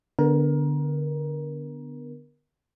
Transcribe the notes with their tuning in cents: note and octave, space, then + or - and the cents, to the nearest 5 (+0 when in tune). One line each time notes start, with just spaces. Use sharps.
D3 +0 B3 +0 A#4 +20